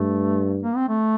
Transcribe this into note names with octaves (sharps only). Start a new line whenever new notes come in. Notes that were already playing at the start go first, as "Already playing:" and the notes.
Already playing: G2 A3
A#3
C4
A3